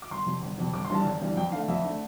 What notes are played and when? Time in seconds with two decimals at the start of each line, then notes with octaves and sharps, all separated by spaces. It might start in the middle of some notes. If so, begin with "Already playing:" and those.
0.02 D6
0.11 G1 C6
0.26 F2 C3
0.42 G1
0.58 F2 C3
0.74 G1 D6
0.85 C6
0.90 G2 E3 G3 A5
1.06 G1
1.21 G2 E3 G3
1.36 F2 G5
1.52 D3 A3 F5
1.68 F2 E5
1.84 D3 A3